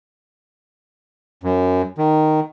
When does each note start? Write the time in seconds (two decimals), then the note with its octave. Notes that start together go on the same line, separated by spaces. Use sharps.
1.44 F#2
1.98 D#3